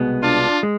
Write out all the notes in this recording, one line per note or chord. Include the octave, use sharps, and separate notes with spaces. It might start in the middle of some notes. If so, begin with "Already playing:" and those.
Already playing: C2 B2 G#3 B3
D4 F4
G#3